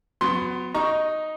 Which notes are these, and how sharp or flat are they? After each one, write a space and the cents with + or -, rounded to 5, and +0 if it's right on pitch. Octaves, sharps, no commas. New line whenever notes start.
F#3 -20 B3 +25 C6 +5
D#4 +0 A#5 +15 C#6 +0